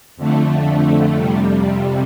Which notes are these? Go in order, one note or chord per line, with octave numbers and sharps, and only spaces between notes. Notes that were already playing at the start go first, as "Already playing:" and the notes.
F2 D3 A3
F2 C3 G3